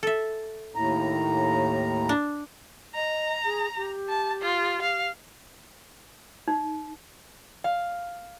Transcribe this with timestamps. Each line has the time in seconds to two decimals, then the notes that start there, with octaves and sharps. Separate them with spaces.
0.03 A4 E5
0.75 D#2 A2 A#5
2.09 D4
2.95 D#5 A#5
3.45 G#4
3.76 G4
4.08 A5
4.42 F4
4.82 F5
6.48 D#4
7.64 F5